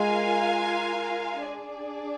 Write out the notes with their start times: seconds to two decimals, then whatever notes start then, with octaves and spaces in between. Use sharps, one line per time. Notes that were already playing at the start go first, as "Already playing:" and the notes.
Already playing: G#3 F4 A#4 F5 G#5
1.45 D4 G#4 D5